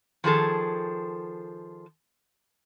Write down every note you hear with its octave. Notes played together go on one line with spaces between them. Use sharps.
D#3 F3 G#4 A4